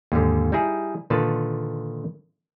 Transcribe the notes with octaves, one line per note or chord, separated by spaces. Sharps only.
D#2 G#2 D3
G3 D#4 E4 G#4
A#2 D3 D#3 F4 B4 A5